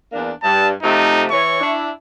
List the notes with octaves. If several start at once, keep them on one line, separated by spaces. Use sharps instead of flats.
E2 A#3 D4
G2 A5
C3 F3 A3 D#4
E3 C#5 C#6
D4 E4